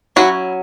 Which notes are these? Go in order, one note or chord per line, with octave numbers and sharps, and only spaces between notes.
F#3 C#4 E4 F#4